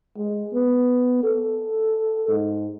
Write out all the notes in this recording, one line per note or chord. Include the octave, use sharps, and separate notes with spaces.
G#3
B3
A4
G#2